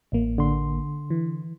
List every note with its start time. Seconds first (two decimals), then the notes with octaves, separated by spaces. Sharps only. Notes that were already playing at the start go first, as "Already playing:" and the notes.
0.12 A1 A#3
0.38 D3 C6
1.10 E3